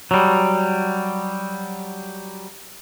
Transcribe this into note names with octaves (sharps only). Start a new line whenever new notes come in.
F#3 G3